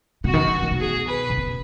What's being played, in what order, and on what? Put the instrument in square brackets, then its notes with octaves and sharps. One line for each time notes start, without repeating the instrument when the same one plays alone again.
[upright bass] B2 [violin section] F#4
[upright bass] D#3
E3
D#3
D#3
B2
[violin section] G#4
B4
[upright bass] B2
C#3